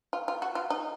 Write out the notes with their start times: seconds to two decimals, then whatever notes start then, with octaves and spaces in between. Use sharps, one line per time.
0.13 F4
0.28 F4
0.42 F#4
0.55 F4
0.70 D#4